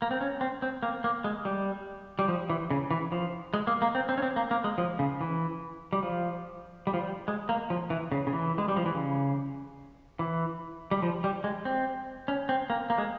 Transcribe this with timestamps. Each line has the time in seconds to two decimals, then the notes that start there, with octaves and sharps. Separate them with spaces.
0.02 A#3
0.11 C4
0.21 C#4
0.41 C4
0.62 C4
0.83 A#3
1.04 A#3
1.24 G#3
1.45 G3
2.19 G3
2.28 F3
2.50 E3
2.70 C#3
2.91 E3
3.12 F3
3.54 G#3
3.67 A#3
3.82 A#3
3.95 C4
4.09 C4
4.18 C#4
4.22 C4
4.36 A#3
4.51 A#3
4.64 G#3
4.78 F3
4.99 C#3
5.21 E3
5.93 G3
6.03 F3
6.87 G3
6.94 F3
7.00 G3
7.28 G#3
7.49 A#3
7.70 F3
7.90 E3
8.12 C#3
8.27 C#3
8.33 E3
8.58 G#3
8.68 G3
8.76 F3
8.86 E3
8.95 C#3
10.19 E3
10.91 G3
11.02 F3
11.24 G3
11.44 G#3
11.65 C4
12.28 C#4
12.49 C4
12.70 A#3
12.90 A#3
12.98 G#3